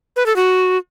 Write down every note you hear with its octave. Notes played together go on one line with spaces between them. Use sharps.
B4
A4
F#4